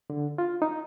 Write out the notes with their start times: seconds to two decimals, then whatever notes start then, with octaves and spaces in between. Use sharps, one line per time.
0.10 D3
0.38 F4
0.62 D#4